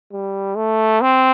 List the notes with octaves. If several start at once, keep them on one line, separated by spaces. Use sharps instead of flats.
G3
A3
C4